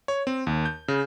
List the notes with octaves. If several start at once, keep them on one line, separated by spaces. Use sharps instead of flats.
C#5
C4
D#2
G6
C#3